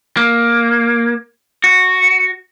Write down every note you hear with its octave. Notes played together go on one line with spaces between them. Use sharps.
A#3
F#4